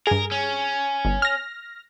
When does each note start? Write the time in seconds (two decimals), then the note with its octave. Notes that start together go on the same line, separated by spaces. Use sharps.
0.07 G2 G#4 A#4
0.31 C#4
1.05 G1
1.22 F6 A#6